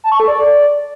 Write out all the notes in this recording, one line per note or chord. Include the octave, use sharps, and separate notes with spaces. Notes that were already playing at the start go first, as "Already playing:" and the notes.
A5
C#6
A4
D5